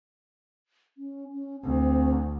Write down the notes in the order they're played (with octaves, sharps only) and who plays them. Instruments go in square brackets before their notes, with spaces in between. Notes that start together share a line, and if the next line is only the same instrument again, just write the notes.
[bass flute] C#4
C#4
[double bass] D2 [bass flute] C4